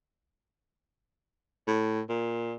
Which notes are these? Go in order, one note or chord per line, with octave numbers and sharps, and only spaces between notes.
A2
A#2